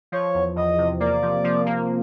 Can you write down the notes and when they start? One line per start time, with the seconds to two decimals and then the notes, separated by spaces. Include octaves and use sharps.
0.12 F3 C#5
0.34 E2
0.56 E2 D#5
0.78 C3
1.00 A#3 D5
1.22 F3
1.44 F3
1.66 A#3